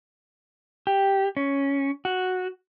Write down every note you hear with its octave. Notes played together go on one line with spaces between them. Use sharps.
G4
C#4
F#4